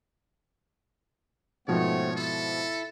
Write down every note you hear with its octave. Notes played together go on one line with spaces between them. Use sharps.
G#2 B2 F3 A3 B3 C4 C#5
E4 A4